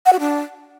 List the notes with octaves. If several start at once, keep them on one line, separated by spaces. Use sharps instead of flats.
F#5
F#4
D4